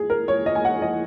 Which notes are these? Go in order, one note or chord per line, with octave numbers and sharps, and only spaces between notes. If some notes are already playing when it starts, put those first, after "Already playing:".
Already playing: G#2 G#4
A#4
C#5
D#5
G#5
F#5
D#5